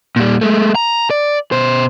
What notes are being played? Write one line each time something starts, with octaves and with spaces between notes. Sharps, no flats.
A#2 G3
G#3 A3
A#5
D5
B2 C5